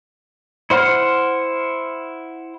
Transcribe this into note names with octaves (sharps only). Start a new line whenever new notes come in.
E4 C5 F#5 F6